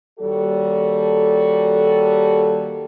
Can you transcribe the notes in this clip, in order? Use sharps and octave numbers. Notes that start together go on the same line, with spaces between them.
D#2 G3 F#4 A4